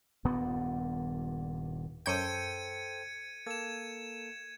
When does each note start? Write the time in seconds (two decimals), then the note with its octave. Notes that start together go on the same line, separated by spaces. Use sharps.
0.25 D#1 G2 A#2 B3
2.06 F#2 A4 C5 G5 G6 G#6 C#7 D#7
3.46 A#3 A4 G#6 E7